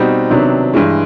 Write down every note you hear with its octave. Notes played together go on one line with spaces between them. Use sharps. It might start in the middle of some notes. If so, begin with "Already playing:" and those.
Already playing: B2 G3 C4 D#4 F#4
C3 D#3 F#3 B3 D4
G2 E3 G#3